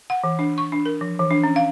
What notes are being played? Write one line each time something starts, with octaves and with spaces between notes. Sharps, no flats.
F#5
E3
D4
C#6
D4
A#4
F3
E3
D4
C#4
F5